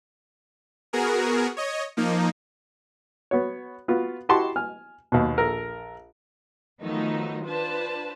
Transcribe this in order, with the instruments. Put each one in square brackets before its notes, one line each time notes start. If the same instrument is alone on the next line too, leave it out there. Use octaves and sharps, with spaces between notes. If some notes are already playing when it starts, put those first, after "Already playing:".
[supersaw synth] B3 F#4 G#4 A#4
C#5 D#5
F3 A#3 D#4
[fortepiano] B3 F#4 C#5
B3 F4 F#4
E4 F#4 G4 A5 C6 C#6
G#5 F6
D#2 B2
A#1 A4 A#4
[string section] D#3 F3 F#3 A3 B3 D#4
D4 F4 B4 C5 A5